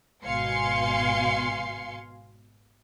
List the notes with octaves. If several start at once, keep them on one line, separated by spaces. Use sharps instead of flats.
G#1 B2 F5 G#5 C6 C#7